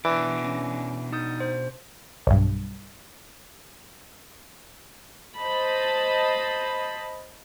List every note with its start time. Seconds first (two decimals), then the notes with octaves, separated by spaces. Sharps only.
0.05 B2 E3 D4 D5
0.44 C#4
1.12 D#4 D#6 G6
1.40 C5
2.27 B1 G2
5.38 C5 D#5 A5 B5